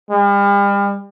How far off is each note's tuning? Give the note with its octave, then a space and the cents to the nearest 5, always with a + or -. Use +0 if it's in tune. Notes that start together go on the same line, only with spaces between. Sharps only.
G3 +40